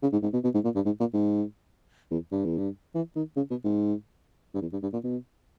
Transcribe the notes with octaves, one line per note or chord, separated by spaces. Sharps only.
C#3
G#2
G#2
B2
B2
G#2
A#2
G2
G#2
A#2
G#2
E2
G2
E2
G2
E3
D#3
C#3
B2
G#2
G2
E2
G2
G2
A#2
B2